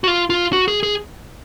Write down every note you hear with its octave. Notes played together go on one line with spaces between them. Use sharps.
F#4
F4
F4
F#4
G#4
G#4